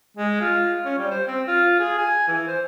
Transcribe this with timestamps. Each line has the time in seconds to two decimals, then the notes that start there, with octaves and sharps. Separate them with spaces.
0.17 G#3
0.41 F4
0.85 C#4
0.98 G3
1.11 C5
1.28 C4
1.47 F4
1.80 G#4
1.98 G#5
2.28 E3
2.48 C5